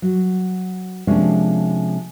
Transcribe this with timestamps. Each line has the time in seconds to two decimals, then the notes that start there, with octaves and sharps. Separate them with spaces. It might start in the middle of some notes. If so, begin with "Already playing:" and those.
0.02 F#3
1.07 C3 F3 G#3 A#3 C#4 D4